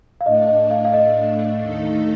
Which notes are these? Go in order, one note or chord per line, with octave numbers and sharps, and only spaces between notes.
F5
A2 A3 D4 D#5
D#5
F5
F5
D#5
D#2 D#3 A3 D#4 A4